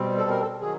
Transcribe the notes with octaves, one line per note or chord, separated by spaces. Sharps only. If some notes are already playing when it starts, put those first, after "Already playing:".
Already playing: B2 G3 C4
A4
A#4
A4
D#3 F#3 G#4